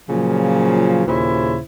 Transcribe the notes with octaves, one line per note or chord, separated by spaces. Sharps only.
A#2 C#3 F3 F#3
D#2 A#2 C#3 E4 C5